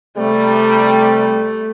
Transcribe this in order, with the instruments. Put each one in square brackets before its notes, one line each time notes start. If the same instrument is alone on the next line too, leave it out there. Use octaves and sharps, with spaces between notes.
[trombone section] C3 G3 [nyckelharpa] A3